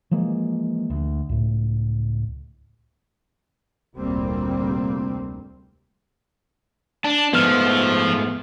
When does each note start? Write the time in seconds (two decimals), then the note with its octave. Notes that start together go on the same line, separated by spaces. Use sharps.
0.11 E3 F3 G#3 A#3
0.90 D2
1.29 C#2 A2
3.95 F1 D2 A#2 G3 A#3 C4
7.04 D4 A5
7.33 G#2 F3 A3 B3 F6